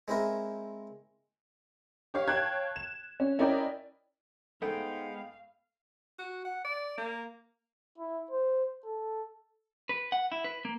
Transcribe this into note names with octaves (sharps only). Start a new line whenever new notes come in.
G#3 C4 E4 A#4
G4 C#5 F5
C#5 F5 G5 A5 F#6 G#6
E7
C#4
C#4 E4 A#4 D5 D#5 G5
G#2 G#3 A3 B3 F5 G5
F#4
F#5
D5
A#3
E4
C5
A4
B4
F#5
E4
B4
A#3